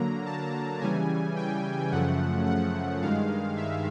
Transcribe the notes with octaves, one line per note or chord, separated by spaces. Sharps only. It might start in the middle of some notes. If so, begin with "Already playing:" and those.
Already playing: D3 F#3 A#3 A#5
A5
C#3 E3 G3 G#5
G5
F#2 C#3 F3 A3 F#5
F#5
G2 D#3 G#3 F5
E5